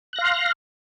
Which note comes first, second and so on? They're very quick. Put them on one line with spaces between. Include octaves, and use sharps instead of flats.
F#6 A#6 F5 C6 F6